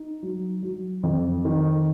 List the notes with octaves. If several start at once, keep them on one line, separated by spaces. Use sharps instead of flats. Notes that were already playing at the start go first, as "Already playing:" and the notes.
Already playing: D#4
F#3
F#3
F2
D#3